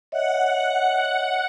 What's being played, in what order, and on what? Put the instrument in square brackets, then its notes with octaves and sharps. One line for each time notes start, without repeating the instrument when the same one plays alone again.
[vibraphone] C#5 D#5 E5 [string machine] F#5